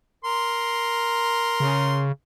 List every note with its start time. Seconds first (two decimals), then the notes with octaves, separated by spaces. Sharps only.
0.24 A#4 C6
1.60 C#3